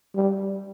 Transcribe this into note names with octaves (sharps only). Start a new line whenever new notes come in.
G3